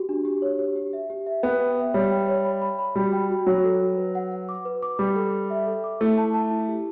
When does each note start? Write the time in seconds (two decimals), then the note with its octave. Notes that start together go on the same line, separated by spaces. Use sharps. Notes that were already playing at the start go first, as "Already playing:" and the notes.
Already playing: F#4 G4
0.09 D4
0.25 G4
0.42 C#5
0.59 G4
0.76 G4
0.93 E5
1.10 G4
1.26 E5
1.43 B3 G5
1.61 G5
1.78 E5
1.94 G3 C#5
2.11 G5
2.28 C#5
2.45 B5
2.62 B5
2.79 B5
2.95 G3 F#4
3.13 G5
3.30 F#4
3.46 F#3 F#4
3.64 A4
3.81 F#4
3.97 B4
4.15 F#5
4.32 F#5
4.49 D6
4.65 B4
4.82 D6
4.99 G3 D6
5.16 A4
5.33 A4
5.50 E5
5.67 A4
5.84 D6
6.01 A3 E4
6.18 A5
6.34 A5
6.51 E4
6.68 G4